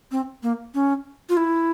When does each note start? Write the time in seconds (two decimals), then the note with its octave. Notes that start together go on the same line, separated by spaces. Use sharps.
0.12 C4
0.43 A#3
0.74 C#4
1.29 F4
1.37 E4